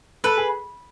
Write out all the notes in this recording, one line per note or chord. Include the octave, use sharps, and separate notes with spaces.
A4 B4
G#4